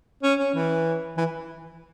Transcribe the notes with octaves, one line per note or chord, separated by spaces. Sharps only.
C#4
C#4
E3
E3